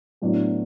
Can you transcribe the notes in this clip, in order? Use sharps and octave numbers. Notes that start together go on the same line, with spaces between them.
A2 F#3 B3 D4